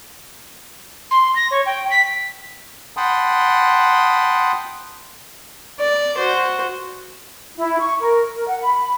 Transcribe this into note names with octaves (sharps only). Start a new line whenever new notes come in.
C6
A#6
C#5
G5
B6
F#5 G5 A5 B5 C6 D#6
D5
F#4 C5
E4
C#6
A#4
A#4
F#5
B5
B5